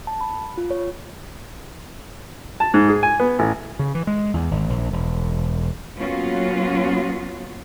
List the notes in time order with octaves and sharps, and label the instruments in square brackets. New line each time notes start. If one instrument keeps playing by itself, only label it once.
[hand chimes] A5
B5
F4
C#5
[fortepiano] A5
G#2
G#4
G#5
B3
A1
[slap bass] C#3
E3
G#3
E2
G#1
A#1
E1
[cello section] F#3 A#3 B3 C#4 F4 F#4